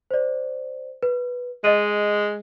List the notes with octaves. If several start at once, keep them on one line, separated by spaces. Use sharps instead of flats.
C5 D5
B4
G#3 D#5 D#7